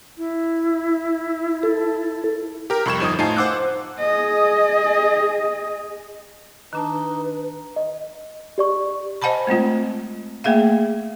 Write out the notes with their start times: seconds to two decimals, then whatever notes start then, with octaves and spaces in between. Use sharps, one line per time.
0.18 E4
1.63 A4
2.70 G4 A#4
2.85 C2 F2 B5 C#6 G#6 E7
3.00 G1 F3 D#4 D#6
3.19 A2 D#4 F4 G#5 A5 C7
3.37 C5 F#5 D6 E6 F#6
3.99 G#4 D#5
6.73 D#3 D4 D#4 B4 A5
7.76 D#5
8.58 G4 D5 C#6
9.22 C5 D#5 F#5 G#5 A5 B5
9.47 G#3 A3 C4 F4
10.44 A3 A#3 G#4 E5 F5